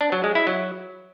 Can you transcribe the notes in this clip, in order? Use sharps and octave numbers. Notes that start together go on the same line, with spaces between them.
D4
F#3
G#3
E4
F#3